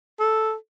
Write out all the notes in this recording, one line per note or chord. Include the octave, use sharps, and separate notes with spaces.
A4